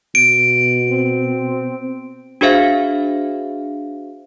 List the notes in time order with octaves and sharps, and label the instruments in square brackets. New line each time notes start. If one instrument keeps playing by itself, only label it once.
[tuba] B2 [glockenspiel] D7
[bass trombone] C4
[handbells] D4 F#4 G#4 C5 E5 F5